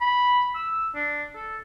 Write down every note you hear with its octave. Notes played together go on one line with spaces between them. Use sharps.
B5
E6
D4
A4